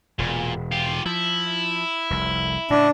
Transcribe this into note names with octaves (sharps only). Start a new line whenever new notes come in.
E1 A#2
F4 G4
F3 E4
F1 C2
A2 C#3 D4